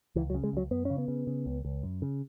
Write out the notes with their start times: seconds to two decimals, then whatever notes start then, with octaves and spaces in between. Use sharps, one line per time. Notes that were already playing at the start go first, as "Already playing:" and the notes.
0.15 C#2 E3
0.30 F#3
0.34 C#3
0.44 G#3
0.53 C#2 F#3
0.71 F#2 B3
0.85 C#3 C#4
0.98 B3
1.08 C#3
1.27 C#3
1.46 C#2
1.65 C#2
1.83 F#2
2.02 C#3